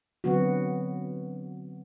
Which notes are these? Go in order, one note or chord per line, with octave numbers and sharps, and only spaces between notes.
D3 F#3 B3 C4 F#4